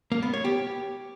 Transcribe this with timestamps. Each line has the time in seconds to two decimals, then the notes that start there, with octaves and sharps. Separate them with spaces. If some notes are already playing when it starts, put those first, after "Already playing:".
0.12 A#3
0.23 B3
0.34 C#5
0.45 G4